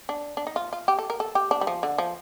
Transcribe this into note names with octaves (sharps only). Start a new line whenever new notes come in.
D4
D4
D#4
F4
F4
G4
A4
A#4
A4
G4
D4
G3
F3
D3
F3